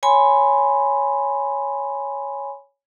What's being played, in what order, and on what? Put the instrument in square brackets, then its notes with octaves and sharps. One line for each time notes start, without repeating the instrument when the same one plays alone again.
[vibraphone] C#5 G#5 B5 C6